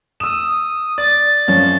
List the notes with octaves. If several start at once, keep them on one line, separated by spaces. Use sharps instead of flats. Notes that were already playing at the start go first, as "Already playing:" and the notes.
D#6 E6 E7
D5 A6
F#2 F3 C#4